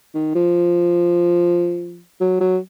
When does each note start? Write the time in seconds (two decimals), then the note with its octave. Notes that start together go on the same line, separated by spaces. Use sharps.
0.14 D#3
0.35 F3
2.21 F#3
2.40 F#3